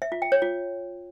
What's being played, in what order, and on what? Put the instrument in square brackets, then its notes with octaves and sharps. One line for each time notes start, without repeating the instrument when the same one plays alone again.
[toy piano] E5
F4
G5
C#5
F4